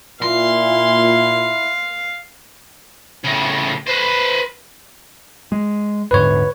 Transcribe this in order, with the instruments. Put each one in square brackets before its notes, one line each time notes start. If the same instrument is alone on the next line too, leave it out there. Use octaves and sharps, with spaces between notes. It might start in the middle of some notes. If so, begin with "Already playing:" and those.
[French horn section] A#2 [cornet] E4 [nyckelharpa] F5 [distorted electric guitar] C6
[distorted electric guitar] A2 C#3
B4 C5
[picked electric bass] G#3
[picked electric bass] D#1 G#2 D3 [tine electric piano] B4 C#5